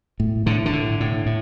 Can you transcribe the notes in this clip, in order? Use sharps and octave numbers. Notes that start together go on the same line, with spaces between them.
A2
A2 D3
D3
A2
A2
A2